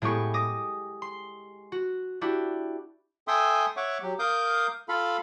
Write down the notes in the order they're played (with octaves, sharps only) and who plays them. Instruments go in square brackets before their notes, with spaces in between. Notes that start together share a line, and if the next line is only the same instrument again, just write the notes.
[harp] A2 G#3 B3 G4 C#6
D6 D#6 A#6
C6
F#4
D4 E4 F#4 G4
[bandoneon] A4 E5 G5 G#5 C6 D#6
C#5 E5 F#5 C#6 D6
F#3 G4
A#4 F5 D6 D#6 G6
F4 A4 F5 B5